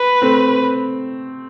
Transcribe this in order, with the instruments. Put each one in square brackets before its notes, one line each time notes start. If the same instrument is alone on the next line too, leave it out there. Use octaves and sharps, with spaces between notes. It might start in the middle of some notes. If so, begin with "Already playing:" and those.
Already playing: [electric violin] B4
[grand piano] A3 C4